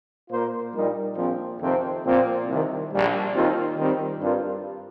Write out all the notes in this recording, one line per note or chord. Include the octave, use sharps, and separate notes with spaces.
A#2 A#3 F4 C5
A#1 A#2 G3 D#4 A#4
A#1 A#2 F3 C4
F2 C3 D#3 C4
A#2 F3 C4
C2 C3 D#3
A#1 A#2 G3
D#2 D#3 C4 F4
D#3 G3 C4 G4
G2 G3 C4 F4 A#4